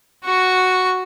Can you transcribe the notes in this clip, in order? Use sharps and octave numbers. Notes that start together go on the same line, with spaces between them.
F#4 C#6